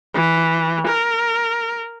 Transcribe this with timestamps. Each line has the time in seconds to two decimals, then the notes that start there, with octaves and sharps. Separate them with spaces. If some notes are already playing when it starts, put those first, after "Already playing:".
0.14 E3
0.85 A#4